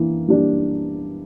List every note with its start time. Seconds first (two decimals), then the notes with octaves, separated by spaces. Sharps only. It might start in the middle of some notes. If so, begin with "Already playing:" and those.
Already playing: E3 A#3 D4
0.28 G3 A#3 D4 G4